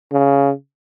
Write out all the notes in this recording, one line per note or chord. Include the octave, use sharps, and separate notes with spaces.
C#3